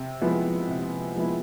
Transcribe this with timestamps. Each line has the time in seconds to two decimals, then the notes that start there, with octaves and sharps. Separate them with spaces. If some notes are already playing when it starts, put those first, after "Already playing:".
Already playing: C3
0.21 F3 G#3 B3 E4
0.69 C3
1.16 F3 G#3 B3 E4